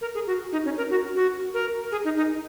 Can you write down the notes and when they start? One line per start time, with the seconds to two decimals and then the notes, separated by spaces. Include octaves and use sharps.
0.01 A#4
0.14 G#4
0.27 F#4
0.52 D#4
0.65 C#4
0.77 A#4
0.90 F#4
1.16 F#4
1.54 A#4
1.92 G#4
2.04 D#4
2.17 D#4